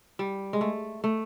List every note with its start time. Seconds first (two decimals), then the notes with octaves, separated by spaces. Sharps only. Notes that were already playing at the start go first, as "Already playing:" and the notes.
0.19 G3
0.53 G#3
0.61 A3
1.04 A3